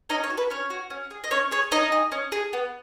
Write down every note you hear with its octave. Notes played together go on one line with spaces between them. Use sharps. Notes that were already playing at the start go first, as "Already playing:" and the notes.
C#4 D#4 D#5
C#5
F#4
B4
C#4 C#5
F#4
C#4
G#4
D#5
C#4 C#5
G#4 C#5
C#4 D#4 D#5
G#4
C#4
G#4
B3